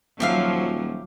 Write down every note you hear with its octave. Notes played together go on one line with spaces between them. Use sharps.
D#1 F3 F#3 G4 E5 F5